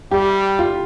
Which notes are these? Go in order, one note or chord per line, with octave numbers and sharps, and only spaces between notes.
G3 G4
F4